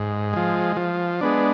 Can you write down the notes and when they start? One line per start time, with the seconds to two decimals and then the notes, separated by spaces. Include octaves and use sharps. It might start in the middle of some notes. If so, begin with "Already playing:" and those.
Already playing: G#2
0.33 F3 G#3
0.77 F3
1.21 G#3 B3 D4